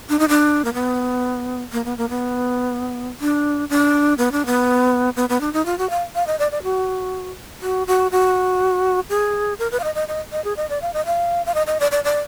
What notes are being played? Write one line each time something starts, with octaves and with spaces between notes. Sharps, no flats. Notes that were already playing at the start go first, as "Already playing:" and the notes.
D4
D#4
D4
A#3
B3
A#3
B3
A#3
B3
D4
D4
B3
D4
B3
B3
B3
D4
D#4
F4
F#4
F5
F5
D#5
D5
D5
F#4
F#4
F#4
F#4
G#4
A#4
B4
F5
D#5
D#5
D#5
D#5
G#4
D#5
D5
F5
D#5
F5
F5
D#5
D#5
D5
D5
D5